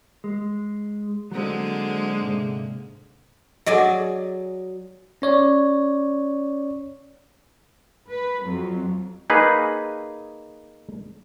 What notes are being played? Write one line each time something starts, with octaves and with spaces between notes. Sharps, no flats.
G#3
D3 F#3 G#3 A#3 C4
G#2 C3
F#3 G#4 A4 D5 D#5 G#5
C#4 C#5 D5
B4
F2 F#3
A#3 D#4 G#4 B4